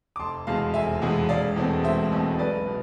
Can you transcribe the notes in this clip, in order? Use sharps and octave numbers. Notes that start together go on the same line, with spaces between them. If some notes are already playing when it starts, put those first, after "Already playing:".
D6
F1 A5 C6
E2 B2 G#3 F5 A5
F1 E5 G#5
E2 B2 G#3
E1 D5 F5
E2 B2 A3 C4
E1 C5 E5
E2 B2 A3 C4
B1 B4 D5
B2